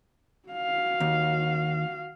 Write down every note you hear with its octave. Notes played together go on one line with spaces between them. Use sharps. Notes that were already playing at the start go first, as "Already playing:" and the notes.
F#4 F5
D#2